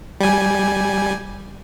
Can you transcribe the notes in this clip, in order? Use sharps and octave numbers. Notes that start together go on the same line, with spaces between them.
G3 G#5